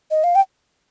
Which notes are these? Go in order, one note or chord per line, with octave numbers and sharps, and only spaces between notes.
D#5
F5
G5